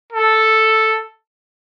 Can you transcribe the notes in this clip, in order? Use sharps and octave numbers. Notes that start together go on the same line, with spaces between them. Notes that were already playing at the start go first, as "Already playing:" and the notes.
A4